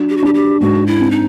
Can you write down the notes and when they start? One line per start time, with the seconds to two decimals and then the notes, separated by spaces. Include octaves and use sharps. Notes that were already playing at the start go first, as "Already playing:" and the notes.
Already playing: F#3 D4
0.09 G4
0.17 F#4
0.22 D4 G4
0.34 G4
0.60 G#2 F#4
0.87 E4
0.99 C4
1.11 D#4